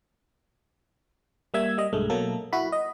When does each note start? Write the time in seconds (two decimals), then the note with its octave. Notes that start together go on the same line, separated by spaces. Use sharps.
1.54 G3 A#3 E5 E6 G#6
1.78 G3 D#5
1.93 B1 G2 G#3 A3
2.10 B2 F#3 A#3 A4
2.53 E4 F#4 B5
2.72 D#5